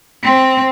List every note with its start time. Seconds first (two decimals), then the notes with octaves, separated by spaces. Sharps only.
0.24 C4